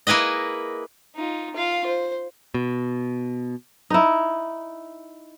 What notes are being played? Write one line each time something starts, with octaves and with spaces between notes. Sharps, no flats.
A#3 E4 G#4 B4 D#5
D#4 F4
F4 F5
C5
B2
D#4 E4